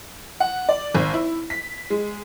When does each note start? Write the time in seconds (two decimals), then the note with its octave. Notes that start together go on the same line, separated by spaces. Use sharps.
0.40 F#5
0.69 D5
0.95 G#1
1.14 E4
1.50 B6
1.90 G#3